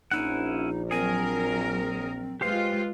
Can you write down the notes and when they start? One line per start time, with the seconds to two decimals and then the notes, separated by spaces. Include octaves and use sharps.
0.11 A#1 C#4 D#4 E4 F#5
0.91 F#3 C4 G#4 A#4 G#5
2.41 G#3 F4 G4 B4 C5 F5